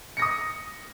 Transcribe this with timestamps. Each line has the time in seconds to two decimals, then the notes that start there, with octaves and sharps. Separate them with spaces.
0.17 C#7
0.19 A#6
0.22 D#6